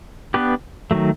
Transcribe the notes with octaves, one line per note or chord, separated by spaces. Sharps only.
B3 D4 G4 B4
D#3 F#3 A3